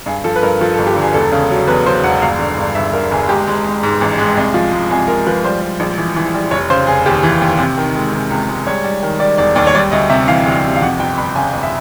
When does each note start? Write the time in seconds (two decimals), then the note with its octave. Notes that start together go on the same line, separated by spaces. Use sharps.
0.06 G2 G#4
0.24 F3 A4
0.36 B4
0.43 G2 A#4
0.61 F3 A4
0.74 A4
0.78 G1
0.87 G4
0.96 D3
1.01 G#4
1.14 E1 A4
1.32 C#3
1.50 F#3
1.67 E2 B4
1.86 F#3 C5
2.03 E1 F#5
2.22 G1 F5
2.39 D3
2.57 G2
2.75 G2 E5
2.93 G1 A#4
3.11 G1 G#4
3.29 G#3 G4
3.48 G#3
3.64 G#3
3.83 G#2
4.01 A1
4.18 G#3
4.37 C2
4.54 F3
4.72 G#3
4.90 C2 G#4
5.08 G#3 A#4
5.26 F3 B4
5.44 G3 C5
5.61 G3
5.80 A#1
5.98 E3
6.16 E3
6.34 G3
6.51 F1 C#5
6.70 C#3 C5
6.87 F1 G#4
7.06 D#2 G4
7.23 E3
7.41 D#2
7.59 C3
7.78 D#3
7.95 G#3
8.13 C3
8.30 C#2
8.49 G#3
8.66 G3 C#5
8.84 G3
9.03 D#3
9.20 G3 D5
9.38 E1 D5
9.56 D#2 D5
9.67 C#5
9.75 G3 D5
9.91 D2 D#5
10.10 C3 E5
10.28 E3 F5
10.46 D2
10.63 C3
10.76 F5
10.82 F2 F#5
10.99 G1 G5
11.18 G1 B5
11.35 C#3 G#5
11.53 G1
11.63 E5